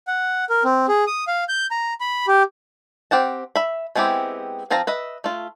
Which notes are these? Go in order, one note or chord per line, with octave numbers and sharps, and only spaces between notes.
F#5
A#4
C4
G#4
D#6
F5
G6
A#5
B5
G4
C4 G4 F#5 A5
E5 B5
G#3 B3 C4 E4 G4
F3 C4 F5 A5 A#5
B4 D#5 E5
A3 F4